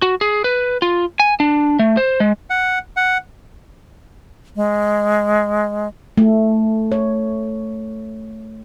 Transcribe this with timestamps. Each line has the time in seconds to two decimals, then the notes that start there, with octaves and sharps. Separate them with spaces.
0.02 F#4
0.21 G#4
0.44 B4
0.82 F4
1.20 G#5
1.40 D4
1.79 A3
1.97 C5
2.20 G#3
2.50 F#5
2.97 F#5
4.56 G#3
6.18 A3
6.92 C#5